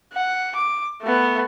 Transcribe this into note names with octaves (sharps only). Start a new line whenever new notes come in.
F#5
D6
A3 B3